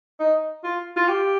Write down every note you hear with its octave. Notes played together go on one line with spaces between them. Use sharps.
D#4
F4
F4
G4